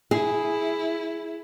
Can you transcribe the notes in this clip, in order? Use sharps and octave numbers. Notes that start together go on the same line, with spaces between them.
E4 G#4